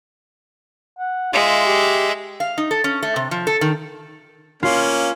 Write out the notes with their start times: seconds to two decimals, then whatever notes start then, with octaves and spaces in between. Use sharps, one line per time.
0.99 F#5
1.33 G#3 F4 E5
1.65 G4
2.40 F5
2.58 D#4
2.71 A4
2.84 C#4
3.03 A3
3.16 C3
3.31 F3
3.47 A4
3.61 D#3
4.63 A#3 C#4 F4